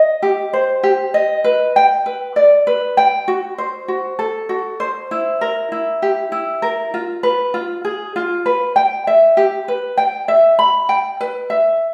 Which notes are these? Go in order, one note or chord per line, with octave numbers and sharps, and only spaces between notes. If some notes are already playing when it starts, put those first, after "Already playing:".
Already playing: D#5
G4
C5
G4
D#5
B4
G5
B4
D5
B4
G5
F#4
C5
F#4
A4
F#4
C5
E4
A#4
E4
G4
E4
A#4
F4
B4
F4
G#4
F4
B4
G5
E5
G4
B4
G5
E5
B5
G5
B4
E5